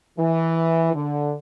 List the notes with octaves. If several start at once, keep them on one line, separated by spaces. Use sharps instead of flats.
E3
D3